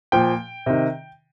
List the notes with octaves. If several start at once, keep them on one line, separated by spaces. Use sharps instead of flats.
A#2 F3 G5
C3 D#3